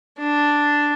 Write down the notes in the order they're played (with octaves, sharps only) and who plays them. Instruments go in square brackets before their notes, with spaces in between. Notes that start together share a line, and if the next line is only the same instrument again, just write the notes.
[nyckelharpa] D4